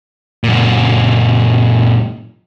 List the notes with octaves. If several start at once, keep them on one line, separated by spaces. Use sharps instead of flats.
F#2 A#2